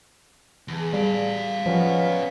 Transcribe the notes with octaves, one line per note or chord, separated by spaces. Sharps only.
E2 G#4 A5
G3 D5 F5
D#3 F3 F#3 B3 C#4 F4